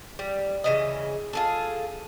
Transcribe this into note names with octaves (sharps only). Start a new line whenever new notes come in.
G3
C#3 E3 D#5
F4 G#4 A4